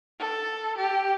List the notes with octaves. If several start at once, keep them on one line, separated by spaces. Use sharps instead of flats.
A4
G4